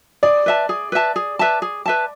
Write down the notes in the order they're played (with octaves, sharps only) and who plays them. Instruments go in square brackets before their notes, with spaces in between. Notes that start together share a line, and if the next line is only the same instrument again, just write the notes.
[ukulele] G#4 [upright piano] D5
[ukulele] B4 E5 A5
G#4
B4 E5 A5
G#4
B4 E5 A5
G#4
B4 E5 A5